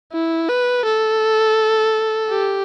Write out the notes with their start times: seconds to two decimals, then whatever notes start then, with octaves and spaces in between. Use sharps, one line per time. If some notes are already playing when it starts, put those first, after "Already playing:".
0.13 E4
0.49 B4
0.86 A4
2.31 G4